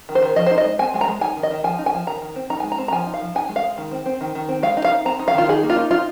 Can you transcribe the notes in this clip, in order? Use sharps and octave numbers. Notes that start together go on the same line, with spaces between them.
D#3
C5
D#3
F3 D#5
D#4 C5
D#5
G#3
C4 G#5
G#3 G#5
A#5
G#3
D#4 G#5
D#3
D#5
D#3
F3 G#5
D#4
G#5
F3
D#3 A#5
D#3
C4
D#4 A#5
G#5
G#3
A#5
C4
A#5
F3 G#5
D#4
F5
F3
D#4 G#5
G#3
F5
G#3
D#3
C4
C4
D#3
D#3
C4
G#3 F5
D#4
F5
D#4
C4 A#5
D#4
F5
D#3 F4
D#4 G#4
A#3
F4
D#4
D#4 F4